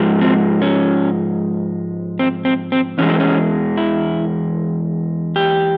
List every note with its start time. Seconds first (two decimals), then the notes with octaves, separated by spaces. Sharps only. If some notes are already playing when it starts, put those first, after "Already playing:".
Already playing: G#2 F3 G#3
0.21 C4
0.62 C#4
2.19 C4
2.45 C4
2.72 C4
2.98 E2 E3 G#3 C#4
3.10 C4
3.20 C#4
3.77 E4
5.36 G4